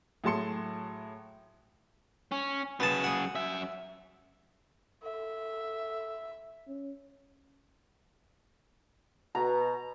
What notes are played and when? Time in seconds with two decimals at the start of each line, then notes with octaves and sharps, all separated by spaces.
0.24 A2 F#3 G#4 A5 C6 C#7
2.32 C#4
2.80 F#2 B3 G#4 A5
3.04 F#5 D#6
3.35 F#2 E5
5.03 A4 E5
6.67 C#4
9.35 B2 A#5